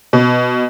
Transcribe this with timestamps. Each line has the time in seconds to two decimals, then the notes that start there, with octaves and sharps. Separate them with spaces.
0.13 B2